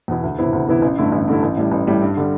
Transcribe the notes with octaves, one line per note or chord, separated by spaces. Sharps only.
E2 B2 B3 E4
D2
C3 E3 B3 E4
D2
C3 E3 B3 E4
A1
G2 D3 A3 E4
A1
G2 D3 A3 E4
A1
A2 G3
A1
A2 G3
G2
D3 G3